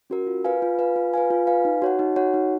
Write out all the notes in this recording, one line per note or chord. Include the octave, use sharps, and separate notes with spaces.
C#4 F#4 A#4
F4
B4 F5 G#5
F4
B4 F5 G#5
F4
B4 F5 G#5
F4
B4 F5 G#5
D#4
F#4 C#5 F#5
D#4
F#4 C#5 F#5
D#4